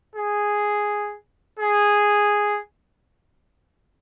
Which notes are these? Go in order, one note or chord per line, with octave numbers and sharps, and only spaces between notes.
G#4
G#4